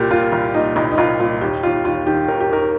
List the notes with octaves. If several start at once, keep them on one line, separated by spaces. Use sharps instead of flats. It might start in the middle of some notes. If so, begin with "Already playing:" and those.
Already playing: C2 A#2 G4 A#4
A#2 F4
C2
A#2 D#4
C2 D#4
D#4
C2 F4
A#2 F4
D#2 G4
D#2 F4
D#2 F4
D#3 G4
D#2 A#4
G4
D#2 A#4